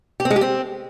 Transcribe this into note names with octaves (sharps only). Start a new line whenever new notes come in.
G4
C4
G#3
G4
C4